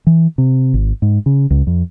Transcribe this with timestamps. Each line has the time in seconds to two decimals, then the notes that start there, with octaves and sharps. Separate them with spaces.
0.07 E3
0.38 C3
0.74 G#1
1.02 G#2
1.26 C#3
1.50 C#2
1.67 F2